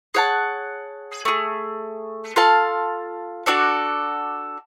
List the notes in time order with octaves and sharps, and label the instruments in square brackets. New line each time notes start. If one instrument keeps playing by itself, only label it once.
[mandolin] G#4 C#5 F#5 A5
A3 D4 G#4
F4 A4 F5 A5
D4 F#4 A4 D5